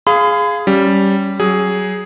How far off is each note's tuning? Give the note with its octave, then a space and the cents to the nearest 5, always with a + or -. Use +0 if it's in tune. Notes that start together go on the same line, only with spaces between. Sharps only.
G#4 +0 F5 -5 B5 +45
G3 -10 C#4 +0
F#3 +25 G#4 +0